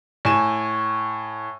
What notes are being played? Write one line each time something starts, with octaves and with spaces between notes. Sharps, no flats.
A2 G#5 E7